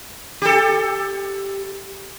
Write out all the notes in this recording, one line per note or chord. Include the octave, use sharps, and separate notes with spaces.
G4 A4